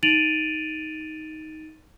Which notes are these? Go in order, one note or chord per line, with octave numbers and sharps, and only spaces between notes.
D#4 A6 D7 D#7 F7 F#7